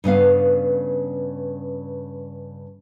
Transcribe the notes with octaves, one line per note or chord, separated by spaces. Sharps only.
G2 C#3 B3 F5